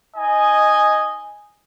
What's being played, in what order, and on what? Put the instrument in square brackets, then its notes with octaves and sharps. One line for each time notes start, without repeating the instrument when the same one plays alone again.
[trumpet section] D#4 D#5 G#5